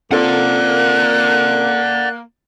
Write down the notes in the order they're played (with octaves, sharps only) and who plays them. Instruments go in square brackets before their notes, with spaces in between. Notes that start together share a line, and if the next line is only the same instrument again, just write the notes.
[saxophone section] A#3 [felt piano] C4 F4 A4 [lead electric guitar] D5 F#5 [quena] F#6